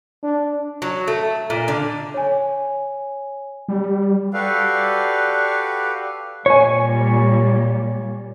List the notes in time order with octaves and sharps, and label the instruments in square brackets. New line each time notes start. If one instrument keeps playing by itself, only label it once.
[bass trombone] D4
[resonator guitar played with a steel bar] F#3
A3
A#2
D3
[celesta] C#5 G#5
[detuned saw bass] G3
[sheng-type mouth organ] F#4 G4 A4 B4 D5 F5
[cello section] A#2 G3 [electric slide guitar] C#5 G#5